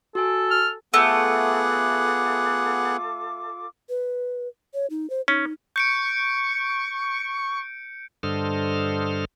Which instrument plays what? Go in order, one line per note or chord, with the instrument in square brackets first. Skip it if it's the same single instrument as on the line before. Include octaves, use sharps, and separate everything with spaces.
[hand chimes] F#4 G#5 [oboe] A4
[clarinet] F6
[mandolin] A3 [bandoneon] B3 G#4 F#5 [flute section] F4 A4 D6
[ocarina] B4
C#5
D#4
C5
[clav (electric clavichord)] C#4 [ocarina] D#4
[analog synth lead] C#6 [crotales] G6 C#7 D7
[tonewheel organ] G2 D3 A4 C5 D#5 F6